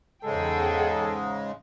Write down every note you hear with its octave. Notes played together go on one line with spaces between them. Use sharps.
E2 G#2 C#3 G#3 G#4 A4 G5